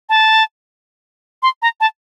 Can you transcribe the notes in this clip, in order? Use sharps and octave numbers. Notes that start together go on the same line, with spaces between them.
A5
C6
A#5
A5